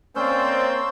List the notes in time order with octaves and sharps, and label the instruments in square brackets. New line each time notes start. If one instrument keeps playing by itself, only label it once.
[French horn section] A#3 C4 [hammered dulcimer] C#4 [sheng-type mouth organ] C5 E6 G6 [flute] D5